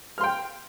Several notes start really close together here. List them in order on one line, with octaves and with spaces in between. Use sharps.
F6 C6 G5